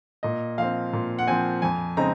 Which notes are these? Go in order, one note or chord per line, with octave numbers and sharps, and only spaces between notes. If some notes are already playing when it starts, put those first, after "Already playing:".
A#2 D#5
F3 C4 F5
A#2
F#5
F3 C4 G#5
F2 G#5
C#3 G#3 C4 D#4 A#5